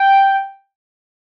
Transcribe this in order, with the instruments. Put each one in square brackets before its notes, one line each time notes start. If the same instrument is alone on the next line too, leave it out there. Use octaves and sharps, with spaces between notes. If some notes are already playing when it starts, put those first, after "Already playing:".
Already playing: [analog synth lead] G5